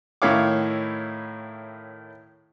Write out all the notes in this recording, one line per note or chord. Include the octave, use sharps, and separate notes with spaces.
A2 D#3 E4 C#5 F5 D6